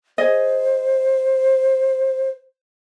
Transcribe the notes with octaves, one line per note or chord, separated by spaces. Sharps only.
G#4 C5 D#5